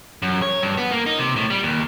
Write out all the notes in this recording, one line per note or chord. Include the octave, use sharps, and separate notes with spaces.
F#2
C#5
G2
B3
A#3
D#4
C3
A2
G3
D#2